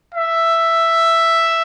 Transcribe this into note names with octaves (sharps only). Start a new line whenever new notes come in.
E5